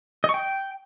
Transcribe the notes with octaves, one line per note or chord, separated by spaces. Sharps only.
D#5
C#6
G5